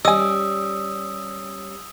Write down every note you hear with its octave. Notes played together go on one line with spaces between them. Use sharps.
G3 C#4 D#5 G#5 D#6 E6